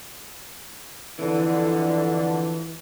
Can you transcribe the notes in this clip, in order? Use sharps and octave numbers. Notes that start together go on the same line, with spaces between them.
F2 D3 E3